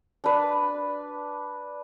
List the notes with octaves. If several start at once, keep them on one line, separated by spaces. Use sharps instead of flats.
D4 B4